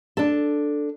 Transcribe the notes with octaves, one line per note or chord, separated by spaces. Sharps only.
D4 A4